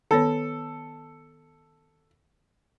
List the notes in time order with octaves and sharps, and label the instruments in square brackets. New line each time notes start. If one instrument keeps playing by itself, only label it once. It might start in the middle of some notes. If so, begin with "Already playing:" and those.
[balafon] D#3 B3 C#5 [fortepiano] A4